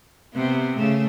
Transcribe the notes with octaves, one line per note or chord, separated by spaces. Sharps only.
C3 B3
C#3 A3